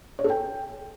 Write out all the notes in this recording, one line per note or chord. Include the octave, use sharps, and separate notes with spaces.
C#5
A4
G5